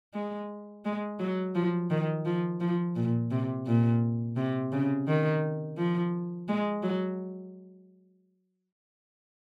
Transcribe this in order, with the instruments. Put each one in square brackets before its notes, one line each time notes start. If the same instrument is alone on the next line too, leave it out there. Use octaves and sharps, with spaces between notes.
[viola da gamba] G#3
G#3
F#3
F3
D#3
F3
F3
A#2
C3
A#2
C3
C#3
D#3
F3
G#3
F#3